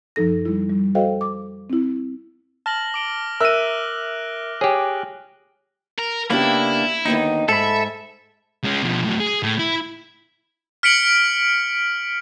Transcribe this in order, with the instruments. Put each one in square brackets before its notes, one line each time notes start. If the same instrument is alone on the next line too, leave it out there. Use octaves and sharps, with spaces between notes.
[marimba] F#2 F3 D#4 A4 A#6
G3 E4
G3
F#4 A4 C5 D#5 F5 G5
D6
C4 E4
[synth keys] A5 [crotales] F6 A#6 F#7
[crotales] D6 D7 G7
[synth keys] A#4 E5 [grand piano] E6 D#7 [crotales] F#6
[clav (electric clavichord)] G4 G#4 [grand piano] C#5
[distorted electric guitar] A#4
[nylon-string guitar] C#3 B3 G4 [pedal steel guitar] A#3 D4 [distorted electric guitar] E4
[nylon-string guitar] D#2 D3 B3 [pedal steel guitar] D#4
[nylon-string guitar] G#2 [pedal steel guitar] A4 B5 [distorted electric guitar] E5
[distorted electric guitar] G#3 C#4
B2 F3
A2 F#3
G#4
A2
E4
[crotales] F6 B6 C#7 D7 F#7